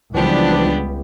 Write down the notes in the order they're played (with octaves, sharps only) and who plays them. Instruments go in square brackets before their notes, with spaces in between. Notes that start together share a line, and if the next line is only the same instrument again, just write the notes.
[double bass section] C#2 [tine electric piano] E3 F3 [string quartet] G3 B3 G4 [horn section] D4